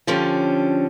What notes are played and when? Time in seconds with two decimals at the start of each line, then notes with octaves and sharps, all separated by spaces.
0.07 D3 F3 C#4 G4